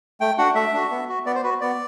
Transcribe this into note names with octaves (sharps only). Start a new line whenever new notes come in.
A3 G5
D4 F#4 F#5
A3 E5
D4 F#4
B3
F#4
B3 D5
C5
F#4 B4
B3 D5